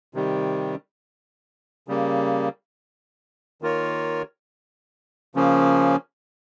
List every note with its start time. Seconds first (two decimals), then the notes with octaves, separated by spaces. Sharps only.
0.14 C3 D#3 G3
1.88 C#3 G3 A#3
3.62 D#3 A#3 F4 A#4 C#5
5.35 C#3 F3 A#3 C#4